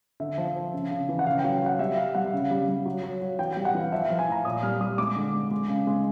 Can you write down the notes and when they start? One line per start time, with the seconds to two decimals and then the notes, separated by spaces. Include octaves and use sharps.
0.20 D3 E5
0.38 F3
0.56 F3
0.73 C#3
0.91 C#3
1.09 E3
1.19 F#5
1.26 C#3 F5
1.39 G5
1.44 F#3
1.53 G5
1.62 F#3 F#5
1.79 G3 E5
1.97 G3 F5
2.15 G3 F#5
2.33 C#3
2.51 G3
2.68 G3
2.85 F#3
3.03 F#3
3.21 F#3
3.39 E3 G5
3.53 G3 G5
3.65 F#5
3.75 E3 F5
3.92 F3 E5
4.06 F3 F5
4.19 G#5
4.28 A2 A#5
4.45 A#2 D#6
4.63 G3 F6
4.81 G3 D#6
4.98 G#3 D6
5.16 D3
5.34 G#3
5.51 G#3
5.69 C#3
5.87 G#3